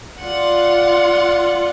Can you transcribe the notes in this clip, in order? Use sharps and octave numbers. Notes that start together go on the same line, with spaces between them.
F4 D5 F#5